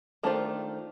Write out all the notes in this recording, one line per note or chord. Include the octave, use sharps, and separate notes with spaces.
D#3 A3 D4 F4 C5